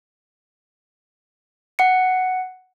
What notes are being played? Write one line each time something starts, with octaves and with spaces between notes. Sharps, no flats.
F#5 C#7